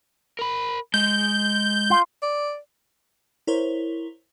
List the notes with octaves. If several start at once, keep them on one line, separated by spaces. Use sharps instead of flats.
A#4 B5
G#3 G6
F4
D5
E4 A#4 C5 C#5